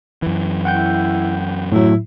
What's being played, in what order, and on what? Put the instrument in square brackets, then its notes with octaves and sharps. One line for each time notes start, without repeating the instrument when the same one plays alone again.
[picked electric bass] F#2 E3
[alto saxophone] E4 [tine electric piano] F#5 G5 G6
[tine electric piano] A2 F#3 [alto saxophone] E4